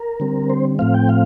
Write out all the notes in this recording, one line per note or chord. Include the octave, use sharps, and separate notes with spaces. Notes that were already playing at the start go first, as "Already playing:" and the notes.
Already playing: A#4
D3 G3 C4
C5
A2 F3 A3 C4 F5
G5
F5